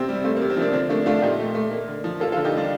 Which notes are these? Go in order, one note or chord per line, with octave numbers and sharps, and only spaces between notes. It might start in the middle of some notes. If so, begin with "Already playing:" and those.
Already playing: C3 C4
G3
A3 C4
A#3
C3
C4
F3 A#3 D4
D3 C4
A3 A#3 D4
A3 D4 F4
A#2 D#4 G4
A3
A3
A#3
D3
F3
A#3 F4 A4
F4 A4
D3
D#4 G4
G3 D4 F4